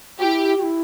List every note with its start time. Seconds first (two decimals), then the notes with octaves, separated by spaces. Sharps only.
0.19 F#4 G4
0.24 E4
0.58 F#4
0.63 E4